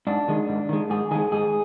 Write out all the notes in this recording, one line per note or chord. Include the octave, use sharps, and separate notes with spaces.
G#2 D4
D#3 G#3
G#2
D#3 G#3
G#2 G#4
D#3 G#3 G#4
G#2 G#4